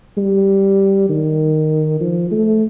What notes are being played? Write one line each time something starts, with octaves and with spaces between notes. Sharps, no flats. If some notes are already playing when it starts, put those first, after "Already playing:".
G3
D#3
F3
A3